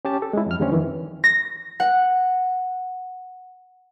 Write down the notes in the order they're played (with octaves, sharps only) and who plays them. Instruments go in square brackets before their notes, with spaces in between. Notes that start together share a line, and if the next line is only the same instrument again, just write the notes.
[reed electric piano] C#4 G4 A5
A4
G#3 E4
F2 F6
E2 D3 G3 A3 C4 C#4
F2 D#3 E3
[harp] A#6
F#5